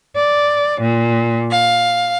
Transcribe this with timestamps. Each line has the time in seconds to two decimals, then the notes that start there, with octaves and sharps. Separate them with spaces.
0.16 D5
0.80 A#2
1.51 F5